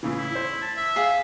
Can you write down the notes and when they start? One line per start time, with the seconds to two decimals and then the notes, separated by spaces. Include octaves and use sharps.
0.03 A2 C#3 E3
0.18 E4
0.35 C5
0.62 A5
0.77 E5
0.96 G#4 F5